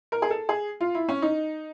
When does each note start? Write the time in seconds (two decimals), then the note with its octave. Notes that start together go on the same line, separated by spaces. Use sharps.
0.12 A#4
0.22 G#4
0.30 A4
0.49 G#4
0.81 F4
0.95 E4
1.09 C#4
1.22 D#4